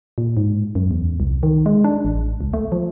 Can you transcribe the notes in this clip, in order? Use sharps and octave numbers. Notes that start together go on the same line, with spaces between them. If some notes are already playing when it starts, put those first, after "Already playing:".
A#2
G#2
F#2
E2
C2
D#3
G#3
D4
A1
C#2
A3
F3